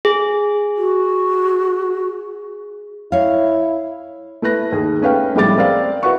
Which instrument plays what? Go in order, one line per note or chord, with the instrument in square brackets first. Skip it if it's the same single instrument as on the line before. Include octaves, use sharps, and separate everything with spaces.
[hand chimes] G#4
[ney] F#4
[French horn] E4 [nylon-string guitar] C#5 F5
[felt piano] A3 E4 B4 F#6 A#6
D#2 G#4
A3 C#4 B4 F5 G5
A#1 A2 G3 G#3 D6 A6
C4 A#4 D5 F5
E4 F#4 B4 F#5 C#6